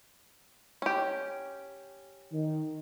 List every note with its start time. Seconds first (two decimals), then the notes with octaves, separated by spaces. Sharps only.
0.82 C#4 G4
2.32 D#3